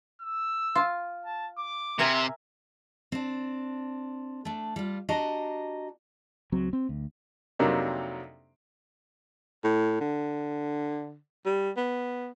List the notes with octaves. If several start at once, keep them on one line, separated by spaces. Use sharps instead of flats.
E6
F4
A5
D6
C3 A#4 E5 G#5 C6
C4 D4
A3 D4
G3 F4
D4 F#4 G4 D#5 A#5
C#2 F#3 C4
C4
D2
F2 C3 F#3 A#3 D4 D#4
A2
D3
G3
B3